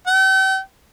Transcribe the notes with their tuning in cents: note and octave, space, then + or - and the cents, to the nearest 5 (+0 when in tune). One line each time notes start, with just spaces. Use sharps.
G5 -40